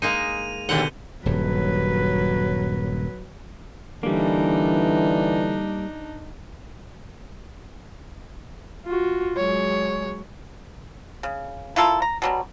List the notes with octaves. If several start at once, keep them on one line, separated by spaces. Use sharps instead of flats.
G#3 A#3 D#4 D#7 F7
D#2 B2 D3 F#5 G6 G7
D#1 G2 F#3 B4
D3 E3 G3 A#3 D4 D#4
F4 F#4
F#3 G#3 C#5
C#3
E4 F4 A4 A#4
A#5
B2 F#3 G3